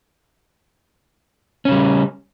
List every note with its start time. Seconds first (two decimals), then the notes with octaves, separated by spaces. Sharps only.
1.65 C#4
1.68 C#3
1.72 G3